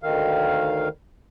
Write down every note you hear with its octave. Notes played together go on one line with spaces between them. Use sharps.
D2 D#3 F5